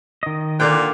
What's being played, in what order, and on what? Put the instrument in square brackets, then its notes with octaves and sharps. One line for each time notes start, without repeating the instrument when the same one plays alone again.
[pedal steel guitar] D#3 D#5
[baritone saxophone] A#2 [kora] D3 D5 G5